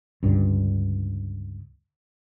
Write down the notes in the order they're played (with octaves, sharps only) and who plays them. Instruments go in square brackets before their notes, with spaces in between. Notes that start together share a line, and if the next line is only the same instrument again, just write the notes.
[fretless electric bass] C#2 G2 D3